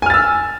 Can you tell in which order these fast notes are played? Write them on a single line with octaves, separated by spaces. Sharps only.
G#5 F6 A6 E6